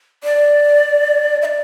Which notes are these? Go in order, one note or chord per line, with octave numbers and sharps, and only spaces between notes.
D5
E5
D5